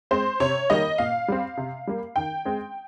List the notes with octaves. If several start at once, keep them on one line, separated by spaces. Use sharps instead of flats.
G#3 C4 C5
C3 C#5
D#3 G3 A#3 D#5
A#2 F5
G3 C4
C3
G3 A#3
D#3 G5
G#3 C4